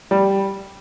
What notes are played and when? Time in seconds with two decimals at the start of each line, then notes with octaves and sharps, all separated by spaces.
0.11 G3